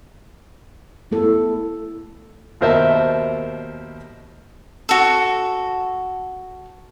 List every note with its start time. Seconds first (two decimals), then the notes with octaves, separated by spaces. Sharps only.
1.11 A3 B3 E4 A4
2.61 D#2 B2 A#4 C5 E5 A5
4.89 F#4 A4